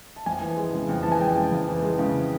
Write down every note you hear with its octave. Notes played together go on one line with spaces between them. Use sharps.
A5
F2 G#5
E3
G#3
C#3
F2
E3 A5
G#5
G#3 G5
C#3
F2
E3
G#3
C#3